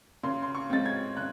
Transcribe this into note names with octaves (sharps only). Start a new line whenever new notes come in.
C#3 C6
C6
C#6
G#3 C4 A6
G#6
C#3 F#6